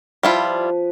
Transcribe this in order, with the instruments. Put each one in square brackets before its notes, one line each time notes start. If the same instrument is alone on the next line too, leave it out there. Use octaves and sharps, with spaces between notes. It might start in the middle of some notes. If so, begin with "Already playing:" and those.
[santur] F3 B4 [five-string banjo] G3 E4 F4